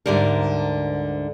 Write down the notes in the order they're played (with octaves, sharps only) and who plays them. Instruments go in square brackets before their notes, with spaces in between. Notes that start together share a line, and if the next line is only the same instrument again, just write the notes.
[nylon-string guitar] D2 G#2 D3 G3 A#4